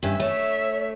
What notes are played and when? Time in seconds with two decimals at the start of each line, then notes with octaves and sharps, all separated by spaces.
0.03 G2 C#4 E5
0.20 A3 C#5